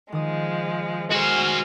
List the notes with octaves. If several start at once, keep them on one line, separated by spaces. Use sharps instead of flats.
D#3 F3 G#3 D#6
G#3 F#4 A#4 C5 G#5 F6